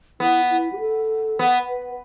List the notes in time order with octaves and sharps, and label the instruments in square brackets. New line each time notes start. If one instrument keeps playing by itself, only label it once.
[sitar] B3 [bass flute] E4
[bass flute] E4
G4
A4
[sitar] B3
[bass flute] B4